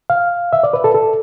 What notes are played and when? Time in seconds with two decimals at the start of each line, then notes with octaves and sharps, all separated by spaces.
0.10 F5
0.53 E5
0.64 D5
0.73 B4
0.84 A4
0.94 A4